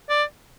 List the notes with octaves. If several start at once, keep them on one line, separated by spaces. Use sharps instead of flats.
D5